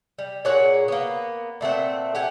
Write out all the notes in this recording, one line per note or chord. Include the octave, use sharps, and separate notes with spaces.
G3
A#2 G#4 C#5 F#5
A#3 B3
A#2 A3 C4 F#5
G4 F#5 G#5